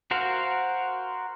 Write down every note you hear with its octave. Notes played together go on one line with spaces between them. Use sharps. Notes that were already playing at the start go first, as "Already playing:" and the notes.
F#4 A#4 C5 F5 F#5